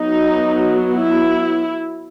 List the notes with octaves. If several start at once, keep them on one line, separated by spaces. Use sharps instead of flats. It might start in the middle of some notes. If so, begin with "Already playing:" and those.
Already playing: F#3 B3 D#4
E4